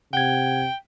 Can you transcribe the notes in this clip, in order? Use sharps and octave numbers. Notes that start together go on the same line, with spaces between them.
C3 F#5 G5 G#6